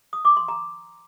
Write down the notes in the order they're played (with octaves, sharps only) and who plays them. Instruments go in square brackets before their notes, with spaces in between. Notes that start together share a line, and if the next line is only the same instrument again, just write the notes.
[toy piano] D#6
D6
C6
A#5